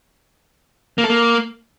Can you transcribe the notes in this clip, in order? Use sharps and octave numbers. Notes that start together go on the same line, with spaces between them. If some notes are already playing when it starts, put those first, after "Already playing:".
A#3
A4
A#3